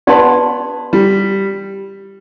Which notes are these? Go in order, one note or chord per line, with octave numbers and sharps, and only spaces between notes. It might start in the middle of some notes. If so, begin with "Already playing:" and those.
B3 G4 D5 A5 C6
G3